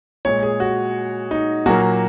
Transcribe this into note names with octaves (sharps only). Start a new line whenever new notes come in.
A#2 G#3 C#5
G#4
F#4
D#4
A#2 F#3 A#3 F#4